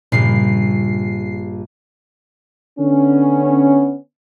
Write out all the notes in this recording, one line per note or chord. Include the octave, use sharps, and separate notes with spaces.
A#1 G2 A#2 C#3 C7
D3 B3 C#4